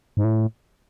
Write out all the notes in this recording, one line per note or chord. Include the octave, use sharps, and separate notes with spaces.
G#2
A2